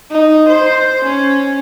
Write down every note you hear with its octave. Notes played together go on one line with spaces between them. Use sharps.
D#4
C5
C#4